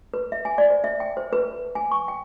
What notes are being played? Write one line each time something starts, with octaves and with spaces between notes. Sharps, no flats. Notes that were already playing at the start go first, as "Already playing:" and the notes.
B4
E5
G#5
D5
C5
E5
G5
C5
B4
G#5
C#6
G5